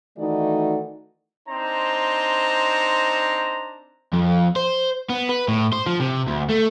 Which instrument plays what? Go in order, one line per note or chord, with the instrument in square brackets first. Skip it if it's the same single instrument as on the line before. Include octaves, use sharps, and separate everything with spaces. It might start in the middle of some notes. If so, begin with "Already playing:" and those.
[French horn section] D#3 E3 A3 D#4 F#4 D5
[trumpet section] C4 D4 D#4 C5 A#5
[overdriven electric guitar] F2
C5
B3
B4
A2
C5
F3
C3
D2
A3